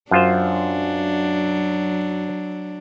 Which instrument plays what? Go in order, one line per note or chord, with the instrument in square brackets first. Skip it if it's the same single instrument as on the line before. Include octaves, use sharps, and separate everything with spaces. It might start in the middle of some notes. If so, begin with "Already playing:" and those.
[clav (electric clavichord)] F#2 F4 C5 [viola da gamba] F#3 D4